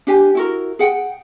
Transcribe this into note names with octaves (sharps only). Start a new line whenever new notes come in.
D4 G4 G#5
E4 F#4 A#4
G#4 F#5 G5